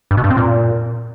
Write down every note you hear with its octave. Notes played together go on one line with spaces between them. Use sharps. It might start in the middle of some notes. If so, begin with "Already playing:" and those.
G2
B2
G2
C4
A#2